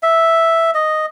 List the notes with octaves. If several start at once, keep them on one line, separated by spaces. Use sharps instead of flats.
E5
D#5